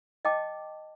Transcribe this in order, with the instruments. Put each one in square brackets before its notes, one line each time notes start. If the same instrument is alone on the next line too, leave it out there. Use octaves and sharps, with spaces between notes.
[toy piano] D#5 G5 A5 D6